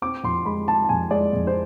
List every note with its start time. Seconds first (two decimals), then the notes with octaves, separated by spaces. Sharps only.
0.02 C4 D6
0.24 F2 C6
0.45 G#3 B5
0.68 G#3 A5
0.84 A5
0.89 F2 G#5
1.10 G#3 D5
1.33 F2
1.47 C5